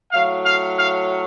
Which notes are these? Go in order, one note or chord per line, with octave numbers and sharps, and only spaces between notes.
A2 F#3 F5
F5
F5